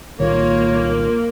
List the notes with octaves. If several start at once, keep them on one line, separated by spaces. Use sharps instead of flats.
C2 A#2 D#3 A#3 F4 C#5